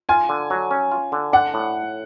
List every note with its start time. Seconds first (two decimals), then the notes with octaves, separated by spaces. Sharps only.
0.09 F4 G#5
0.29 D3
0.50 F#3
0.71 C#4
0.91 F4
1.12 D3
1.33 D4 F#5
1.54 A2